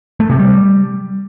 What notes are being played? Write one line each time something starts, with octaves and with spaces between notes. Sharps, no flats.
A3
C3
G3